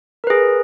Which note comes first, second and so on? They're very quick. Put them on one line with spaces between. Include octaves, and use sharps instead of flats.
A#4 B4 G#4